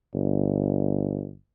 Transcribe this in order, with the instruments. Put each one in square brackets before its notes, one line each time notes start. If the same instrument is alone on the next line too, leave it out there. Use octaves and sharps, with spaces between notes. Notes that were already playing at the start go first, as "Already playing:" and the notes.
[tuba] G1